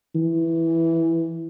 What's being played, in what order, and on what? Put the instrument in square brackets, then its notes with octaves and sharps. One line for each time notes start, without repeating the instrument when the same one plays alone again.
[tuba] E3